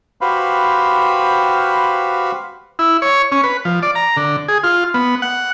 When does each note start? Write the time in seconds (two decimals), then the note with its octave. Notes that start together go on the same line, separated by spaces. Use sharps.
0.21 F#4 G4 B4 C5 F5 B5
2.79 E4
3.02 C#5
3.32 C#4
3.43 B4
3.65 F3
3.83 D5
3.95 A#5
4.17 D3
4.48 G#4
4.64 F4
4.94 B3
5.22 F#5